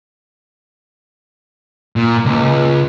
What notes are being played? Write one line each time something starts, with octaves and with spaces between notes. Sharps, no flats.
A#2
C#2